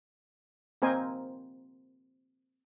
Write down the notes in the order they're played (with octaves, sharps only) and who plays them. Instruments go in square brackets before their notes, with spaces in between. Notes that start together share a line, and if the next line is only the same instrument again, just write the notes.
[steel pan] A#3 C4 A#4 C5 D#5 G#5